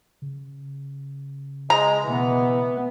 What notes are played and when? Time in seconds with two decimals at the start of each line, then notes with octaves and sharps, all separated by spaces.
0.22 C#3
1.70 G#3 A#5
2.04 B2 E3 B3